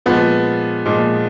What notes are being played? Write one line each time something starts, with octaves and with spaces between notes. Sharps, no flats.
A#2 F3 G#3 B3
A#2 F3 G#3